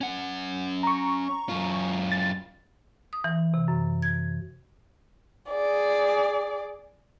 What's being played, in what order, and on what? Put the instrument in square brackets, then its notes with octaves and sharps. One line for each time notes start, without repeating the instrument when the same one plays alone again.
[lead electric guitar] C#4 F#5
[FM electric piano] A#5 C#6
[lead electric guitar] F#2 F4
[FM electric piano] A6
[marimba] D#6
E3
C3
F#2
G#6
[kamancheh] G#4 D5